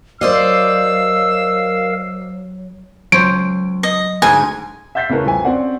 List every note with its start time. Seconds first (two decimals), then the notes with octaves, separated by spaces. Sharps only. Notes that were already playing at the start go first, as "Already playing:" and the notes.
0.21 F#3 A#4 C5 D5 D#5 F5 E6
3.12 C#2 F#3 C5 C#5 D7
3.83 D#5
4.22 D2 G#2 G#4 G#5
4.95 E5 F#5 G6 A6 B6 C7
5.10 C#3 A3 E4 A#4 B4 C#5
5.25 C2 F2 G#5
5.45 C4 C#4 F#4 C5 D5 F#5